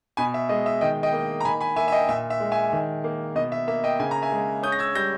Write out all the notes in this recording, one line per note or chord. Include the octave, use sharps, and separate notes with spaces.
B2 G#5 B5
E5
G#3 D#5
E5
D#3 D#5 G5
D#5 G5
A#3
A#5
D#3 G#5 B5
G#5 B5
A#3 E5 G#5
E5
D#5 G5
A#2 E5
E5
G#3
E5 G#5
D#3
A#3
B2 D#5
E5
A#3 E5
D#5 G5
C#3 G#5
A#5
E5 G#5
G#3
C#4 D#6 G6
A#6
E6 G#6
G3 G6 A#6